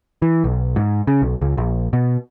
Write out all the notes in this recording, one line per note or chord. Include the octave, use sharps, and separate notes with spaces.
E3
B1
G#2
C#3
B1
C#2
A#1
B2